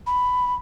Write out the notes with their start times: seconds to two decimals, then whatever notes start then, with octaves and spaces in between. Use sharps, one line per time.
0.07 B5